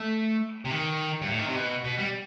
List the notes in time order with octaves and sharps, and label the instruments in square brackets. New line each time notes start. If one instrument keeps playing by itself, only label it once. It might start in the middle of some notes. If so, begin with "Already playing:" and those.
Already playing: [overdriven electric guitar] A3
C3
D#3
G2
A2
D#3
C3
B2
B2
G3